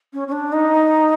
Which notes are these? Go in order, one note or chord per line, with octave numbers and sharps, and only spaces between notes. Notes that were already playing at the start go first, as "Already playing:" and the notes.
C#4
C#4
D4
D#4